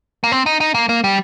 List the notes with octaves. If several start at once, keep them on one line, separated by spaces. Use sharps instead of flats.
A#3
C4
D#4
D#4
A#3
A#3
G3